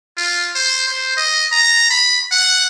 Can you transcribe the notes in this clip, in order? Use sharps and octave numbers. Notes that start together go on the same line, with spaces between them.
F4
C5
C5
D#5
A#5
B5
F#5